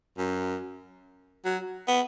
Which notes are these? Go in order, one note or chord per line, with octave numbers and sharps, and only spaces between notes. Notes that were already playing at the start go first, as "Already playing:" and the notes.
F#2
F#3
B3